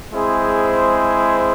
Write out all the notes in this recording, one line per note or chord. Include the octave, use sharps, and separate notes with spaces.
G#3 C4 E4 G#4 C5